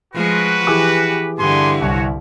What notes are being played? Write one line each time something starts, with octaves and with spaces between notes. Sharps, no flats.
F3 G#3 F#4 B4
E3 G4 G#4 D6
G2 D3 B3 E4 G#5 C6
C2 F#4 C#5